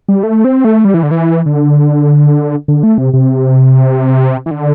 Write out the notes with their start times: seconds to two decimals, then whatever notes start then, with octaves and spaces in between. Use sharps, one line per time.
0.09 G3
0.23 A3
0.45 C4
0.65 A3
0.85 G3
0.94 E3
1.03 D3
1.11 E3
1.46 D3
2.68 D3
2.83 A3
2.98 C3
3.14 C3
4.46 E3
4.51 D3